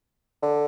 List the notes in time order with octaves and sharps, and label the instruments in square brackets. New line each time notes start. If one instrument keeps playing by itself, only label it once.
[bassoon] D3